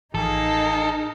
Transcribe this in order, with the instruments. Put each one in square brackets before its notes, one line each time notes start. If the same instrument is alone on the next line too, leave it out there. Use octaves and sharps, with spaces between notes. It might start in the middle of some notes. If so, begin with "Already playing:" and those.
[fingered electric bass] A1 F3 [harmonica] A#3 G#4 [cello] D#4 [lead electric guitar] A4